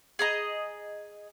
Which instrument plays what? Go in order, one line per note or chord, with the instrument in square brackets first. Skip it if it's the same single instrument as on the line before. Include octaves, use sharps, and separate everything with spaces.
[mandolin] G#4 D#5 A#5